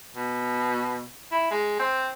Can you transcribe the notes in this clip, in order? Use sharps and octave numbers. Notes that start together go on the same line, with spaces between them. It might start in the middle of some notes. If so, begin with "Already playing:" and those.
B2
E4
G#3
C4